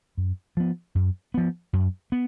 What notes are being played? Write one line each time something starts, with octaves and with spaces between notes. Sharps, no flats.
F#2
F3 B3
F#2
F3 B3
F#2
B3